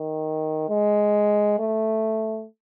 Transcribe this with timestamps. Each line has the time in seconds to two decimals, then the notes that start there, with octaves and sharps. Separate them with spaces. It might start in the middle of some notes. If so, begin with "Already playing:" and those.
Already playing: D#3
0.69 G#3
1.59 A3